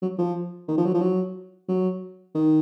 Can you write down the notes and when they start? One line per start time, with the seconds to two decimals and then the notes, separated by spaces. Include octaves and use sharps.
0.02 F#3
0.19 F3
0.68 D#3
0.78 F3
0.85 F#3
0.94 F3
1.01 F#3
1.69 F#3
2.35 D#3